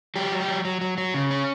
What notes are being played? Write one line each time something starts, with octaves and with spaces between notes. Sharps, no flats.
F#3 G4
F#3
G4
F#3
F#3
F#3
F#3
C#3
C#4